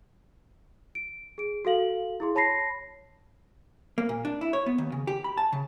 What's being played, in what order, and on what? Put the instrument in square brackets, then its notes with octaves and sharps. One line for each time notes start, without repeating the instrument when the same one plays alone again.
[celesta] D7
G#4 D7
F#4 A4 F5 F#7
E4 G#4 C6
C#5 A5 B5 A#6 C7
[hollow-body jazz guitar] A#3
A#2
D4
E4
C#5
B3
D#2
C#3
G4
B5
A5
C#3